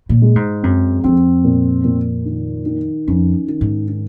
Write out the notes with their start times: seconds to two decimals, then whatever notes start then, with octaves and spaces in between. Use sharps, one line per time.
0.09 A#2
0.22 G#3
0.36 G#2
0.63 F#2 C4
1.04 F2 C4
1.44 A#2
1.84 A#2
2.25 D#3
2.66 D#3
3.07 F2 C#4
3.48 D#3
3.61 G#2
3.88 D#3